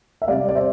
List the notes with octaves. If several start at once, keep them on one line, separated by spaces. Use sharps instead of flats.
E5
C3 G3 D5 F5
D5
C5 E5